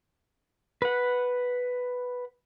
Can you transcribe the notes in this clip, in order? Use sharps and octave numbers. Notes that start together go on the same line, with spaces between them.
B4 F#5